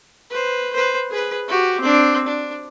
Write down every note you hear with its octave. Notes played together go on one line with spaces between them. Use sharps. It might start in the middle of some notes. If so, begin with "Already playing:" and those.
B4 C5
B4 C5
G#4 B4
F#4 G4
C4 D4
D4